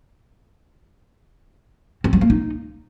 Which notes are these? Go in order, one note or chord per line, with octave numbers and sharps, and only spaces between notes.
C4
F#3
A#3
D#4